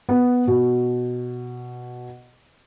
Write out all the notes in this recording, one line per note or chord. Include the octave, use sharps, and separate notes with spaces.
B3
B2